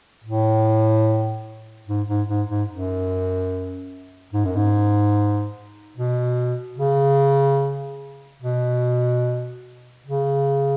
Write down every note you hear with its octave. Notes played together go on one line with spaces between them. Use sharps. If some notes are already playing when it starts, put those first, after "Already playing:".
A2
G#2
G#2
G#2
G#2
F#2
G#2
F#2
G#2
B2
C#3
B2
C#3